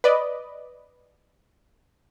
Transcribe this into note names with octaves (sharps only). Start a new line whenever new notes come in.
B4 D5 D#5